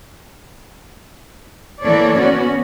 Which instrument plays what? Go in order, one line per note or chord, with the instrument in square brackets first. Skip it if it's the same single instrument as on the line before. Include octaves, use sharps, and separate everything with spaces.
[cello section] E3 A#3 A4 C#5 D5
B3 C#4 F#4